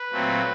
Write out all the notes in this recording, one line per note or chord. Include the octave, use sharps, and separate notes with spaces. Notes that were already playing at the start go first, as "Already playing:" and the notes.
Already playing: B4
A#2 F#3 A3 C4